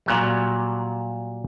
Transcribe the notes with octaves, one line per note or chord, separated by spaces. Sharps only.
A#2 F#3 G3